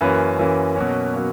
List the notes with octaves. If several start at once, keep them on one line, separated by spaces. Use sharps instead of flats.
F#2 E3 A#3 C#4 B4
F#2 E3 A#3 C#4
B2 F#3 A#3 C#4
B2 F#3 A#3 C#4